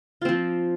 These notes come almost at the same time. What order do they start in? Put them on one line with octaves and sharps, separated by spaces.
F4 C4 F3